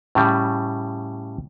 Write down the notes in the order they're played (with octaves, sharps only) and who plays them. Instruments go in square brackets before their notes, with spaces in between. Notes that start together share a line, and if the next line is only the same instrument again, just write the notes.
[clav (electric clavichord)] A2 C#3 G3